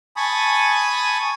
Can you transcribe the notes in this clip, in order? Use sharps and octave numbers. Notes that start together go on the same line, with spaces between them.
G#5 A5 B5 C#6 D#6